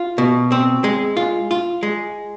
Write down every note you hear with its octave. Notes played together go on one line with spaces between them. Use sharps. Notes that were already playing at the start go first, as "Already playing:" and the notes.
Already playing: F4
B2
C4
G#3
F4
F4
G#3